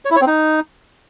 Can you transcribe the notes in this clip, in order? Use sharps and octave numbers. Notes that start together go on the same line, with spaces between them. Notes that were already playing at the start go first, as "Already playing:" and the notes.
C#5
E4
C#5
C4
D#4